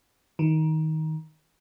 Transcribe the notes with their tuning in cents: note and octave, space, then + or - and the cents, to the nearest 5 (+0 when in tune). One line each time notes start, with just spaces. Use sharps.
D#3 +20